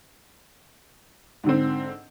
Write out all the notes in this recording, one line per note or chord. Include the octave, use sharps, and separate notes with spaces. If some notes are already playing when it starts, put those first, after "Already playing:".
G#2 D3 C4